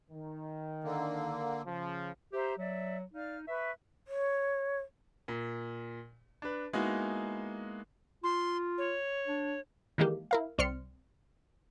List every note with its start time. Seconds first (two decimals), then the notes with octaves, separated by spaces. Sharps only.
0.11 D#3
0.84 D3 A#3
1.67 C#3 F3
2.33 G4 C5 E5 A#5
2.58 F#3 D5 E5
3.14 D#4 D5 F5 F6
3.47 B4 E5 C#6
4.08 C#5
5.28 A#2
6.42 D4 B4
6.73 G#3 A#3 B3 D#4 E4 F#4
8.24 F4 C6
8.78 C#5
9.27 D4
9.98 D#3 E3 G#3 A#3 G4
10.31 E4 A#4 F5
10.58 C2 C4 D5 C6 F6 C#7